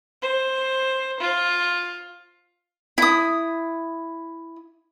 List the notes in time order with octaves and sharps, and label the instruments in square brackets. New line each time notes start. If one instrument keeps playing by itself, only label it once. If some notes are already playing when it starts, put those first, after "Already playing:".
[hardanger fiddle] C5
F4
[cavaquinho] E4 D#6